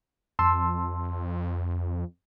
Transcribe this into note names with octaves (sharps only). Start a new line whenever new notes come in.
F2 A5 C6 E6